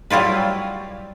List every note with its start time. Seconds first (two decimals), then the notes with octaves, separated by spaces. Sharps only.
0.10 F#3 G3 E4 F4 B4